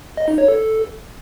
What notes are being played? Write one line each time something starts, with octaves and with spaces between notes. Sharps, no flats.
D#5
D#4
C#5
A4